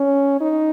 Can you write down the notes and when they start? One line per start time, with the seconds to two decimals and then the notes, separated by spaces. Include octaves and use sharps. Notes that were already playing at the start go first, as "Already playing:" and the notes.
Already playing: C#4
0.41 D#4